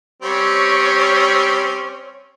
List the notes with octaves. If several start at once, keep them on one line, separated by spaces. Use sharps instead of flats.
G3 C4 C#4 C#5